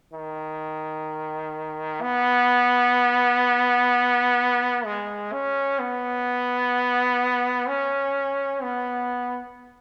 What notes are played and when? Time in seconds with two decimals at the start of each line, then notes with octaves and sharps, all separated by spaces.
0.13 D#3
2.02 B3
4.85 G#3
5.32 C#4
5.79 B3
7.68 C#4
8.62 B3